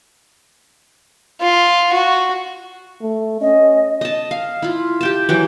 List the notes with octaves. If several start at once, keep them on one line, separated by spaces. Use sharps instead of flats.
F4
F#4
A3
C#4 D#5
D#5 A5
F5
E4 F4
G4 G5 A5
E3 F#3 G5